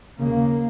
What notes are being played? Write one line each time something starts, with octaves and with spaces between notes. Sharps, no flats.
D#2 C#3 A#3